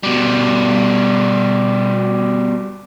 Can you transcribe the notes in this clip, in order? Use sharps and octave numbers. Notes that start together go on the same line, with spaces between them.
B2 G3